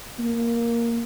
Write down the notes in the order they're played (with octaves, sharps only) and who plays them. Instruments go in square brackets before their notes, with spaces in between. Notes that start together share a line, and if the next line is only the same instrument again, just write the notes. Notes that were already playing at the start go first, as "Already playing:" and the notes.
[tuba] A#3